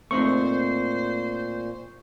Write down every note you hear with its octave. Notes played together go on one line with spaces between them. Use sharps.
A#2 A3 C4 D#4 C5 C#6